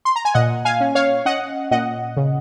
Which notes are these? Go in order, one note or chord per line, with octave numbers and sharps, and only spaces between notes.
C6
A#5
G#5
A#2 D#5 F#5
F5 G#5
C#4
C#5 F5
C#4 D#5 F#5
A#2 D#5 F#5
C#3